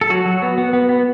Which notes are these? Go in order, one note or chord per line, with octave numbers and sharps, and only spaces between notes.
A4
F#3 F#4
F#3
B3
B3
B3
B3